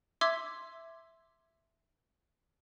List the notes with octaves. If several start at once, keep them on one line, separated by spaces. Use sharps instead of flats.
E5 C6 D6 E6 G#6 B6